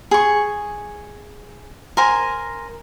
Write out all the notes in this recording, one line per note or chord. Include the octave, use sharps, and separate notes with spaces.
G#4 C#6
A#4 C5 G#5